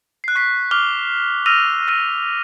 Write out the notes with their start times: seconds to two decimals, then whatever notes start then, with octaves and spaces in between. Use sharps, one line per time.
0.24 F#6 C7
0.35 C#6 F#6 B6 C7
0.71 D6 F6 F7 G7
1.46 E6 F6 A#6 D#7 F7
1.88 E6 F6 A#6 D#7